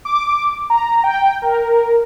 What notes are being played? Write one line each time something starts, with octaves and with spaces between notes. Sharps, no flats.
D6
A#5
G5
A#4